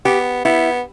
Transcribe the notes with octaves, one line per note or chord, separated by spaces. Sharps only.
B3 G4
B3 E4